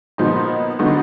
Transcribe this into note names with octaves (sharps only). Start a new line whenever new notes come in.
A#2 F3 B3 D#4
D3 F#3 B3 D#4